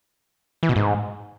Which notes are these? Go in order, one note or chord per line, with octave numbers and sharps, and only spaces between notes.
E3
B2
G#2